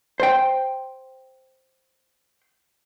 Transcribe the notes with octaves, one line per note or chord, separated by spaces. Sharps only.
C5 G5